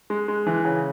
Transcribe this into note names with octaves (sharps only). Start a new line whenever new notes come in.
G#3
G#3
E3
C#3